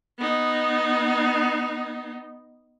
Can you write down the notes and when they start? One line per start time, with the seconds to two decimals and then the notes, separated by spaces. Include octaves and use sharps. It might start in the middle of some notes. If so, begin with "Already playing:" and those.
0.18 B3 D#4